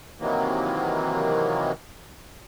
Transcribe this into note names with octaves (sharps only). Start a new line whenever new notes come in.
C3 D#3 E3 F#3 A#3